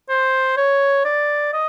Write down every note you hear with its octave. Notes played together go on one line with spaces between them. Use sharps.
C5
C#5
D5
D#5